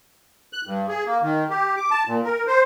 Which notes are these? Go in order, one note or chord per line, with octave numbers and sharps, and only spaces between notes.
F#6
G2
G#4
A#3
D#3
G4
D6
A5
A#2
A#4
C5